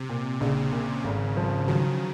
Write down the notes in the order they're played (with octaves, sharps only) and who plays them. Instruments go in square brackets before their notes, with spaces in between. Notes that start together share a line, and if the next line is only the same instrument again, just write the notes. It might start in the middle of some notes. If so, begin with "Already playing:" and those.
Already playing: [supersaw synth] C3
[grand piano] A#2
[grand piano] A#1 [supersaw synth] C#3
[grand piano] A#2
G#1
F3
[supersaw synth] D#3 [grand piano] F#3